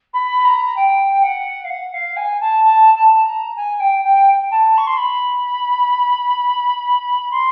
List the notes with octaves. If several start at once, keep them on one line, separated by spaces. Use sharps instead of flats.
B5
A#5
G5
F#5
F5
F#5
F5
G#5
A5
A5
A5
A#5
G#5
G5
G5
A5
C#6
C6
B5
C6